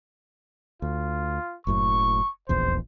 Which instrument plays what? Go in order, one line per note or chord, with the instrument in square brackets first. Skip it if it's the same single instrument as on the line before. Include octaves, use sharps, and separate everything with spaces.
[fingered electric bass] D2 [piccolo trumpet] F4
[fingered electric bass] F#1 F#2 A2 [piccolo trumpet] C#6
[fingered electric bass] D#1 A#1 E2 [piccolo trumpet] C5